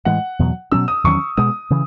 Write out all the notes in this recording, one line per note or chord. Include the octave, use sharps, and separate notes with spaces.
A2 E3 G#3 F#5
E2 B2 F#3
B2 F#3 C#4 E6
D#6
E2 D#3 F#3 C#4 C#6
B2 G#3 B3 D#6
C#3 E3